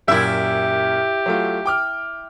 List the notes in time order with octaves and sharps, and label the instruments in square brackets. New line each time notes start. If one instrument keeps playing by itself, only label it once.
[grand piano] F#2 A#2 [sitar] E4 E5 [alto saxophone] G4
[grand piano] F#3 A3 F4
G5 D6 F6